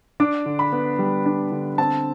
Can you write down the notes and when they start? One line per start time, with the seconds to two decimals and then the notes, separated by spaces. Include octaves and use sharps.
0.20 D4 D6
0.46 D3
0.59 B5
0.72 B3
0.99 G3
1.26 D4
1.52 D3
1.78 C4 A5